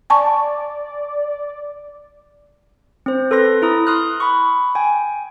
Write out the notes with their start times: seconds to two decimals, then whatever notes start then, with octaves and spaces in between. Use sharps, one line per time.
0.10 D5 G#5 A5 C#6
3.06 C4 C5
3.31 A4 B4 C6 A#6
3.62 E4 A#5 D#6
3.87 C6 D#6 F6 F#6
4.20 B5 C#6
4.75 G5 G#5